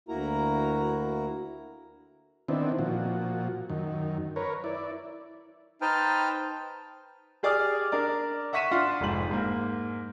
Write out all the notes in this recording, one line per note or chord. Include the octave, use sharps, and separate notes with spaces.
D2 A#3 E4 F#4 A#4 A#5
D#3 B3 C4 D4 E4
A#2 F3 F#4
F#2 D#3
A#4 B4 C#5
E4 D5
D#4 B4 C5 G5 A5 F6
G4 G#4 D5 D6 D#6 F6
D4 A#4 D5
E5 F#5 C#6 B6 D#7 E7
D4 F4 F#5 C6
F1 G#2 F#7
G#2 A#3